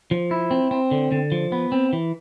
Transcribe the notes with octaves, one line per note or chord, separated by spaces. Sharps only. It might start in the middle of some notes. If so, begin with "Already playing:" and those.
F3
E4
C4
C4
D3
D3
F3
B3
C4
E3